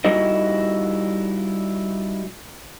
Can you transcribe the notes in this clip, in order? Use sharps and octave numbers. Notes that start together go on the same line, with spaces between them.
G3 D#4 E4 F#4 D#5